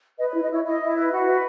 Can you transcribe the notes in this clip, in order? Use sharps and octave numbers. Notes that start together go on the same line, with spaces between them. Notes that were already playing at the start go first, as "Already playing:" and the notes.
B4 D#5
C#5
E4
D#5
E4 C#5
E4 D#5
E4
B4
F#4
B4